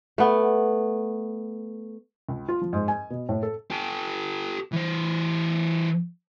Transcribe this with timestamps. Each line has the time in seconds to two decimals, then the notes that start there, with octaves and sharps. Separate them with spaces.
0.18 A3 B3
2.29 C#2
2.48 F4
2.61 F3
2.73 G#2
2.88 G#5
3.10 B2
3.29 A2
3.43 A4
3.70 G4 A4
4.73 E3 C5